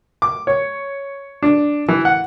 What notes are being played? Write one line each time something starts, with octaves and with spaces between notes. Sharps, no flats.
D6
C#5
D4
E3
F#5